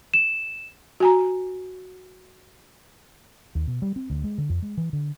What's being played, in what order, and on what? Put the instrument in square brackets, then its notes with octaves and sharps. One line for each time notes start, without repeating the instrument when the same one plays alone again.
[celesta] E7
[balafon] F#4 G#5 A#5
[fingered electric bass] D#2
B2
G3
C4
D2
G#3
D3
F2
G#3
E3
D3